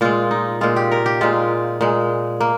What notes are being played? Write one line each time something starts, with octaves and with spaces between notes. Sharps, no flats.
A#2 G#3 F4
D#4
A#2 G#3 F4
G4
A#4
G4
A#2 G#3 F4
A#2 G#3
A#3